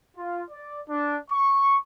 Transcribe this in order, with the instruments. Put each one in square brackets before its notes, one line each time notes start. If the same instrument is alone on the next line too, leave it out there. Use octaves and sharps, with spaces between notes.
[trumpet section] F4
D5
D4
C#6